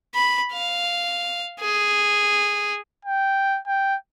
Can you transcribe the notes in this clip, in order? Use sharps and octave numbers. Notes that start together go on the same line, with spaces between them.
B5
F5
G#4
G5
G5